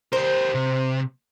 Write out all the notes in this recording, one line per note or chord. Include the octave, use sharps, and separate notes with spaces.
G4 A#4 C5
C3